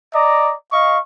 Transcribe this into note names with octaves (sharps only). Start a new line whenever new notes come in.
D5 D#5 A#5
D#5 F5 C#6